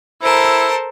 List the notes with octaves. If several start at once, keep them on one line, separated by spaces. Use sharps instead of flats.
E4 A4 A#4 C5 A5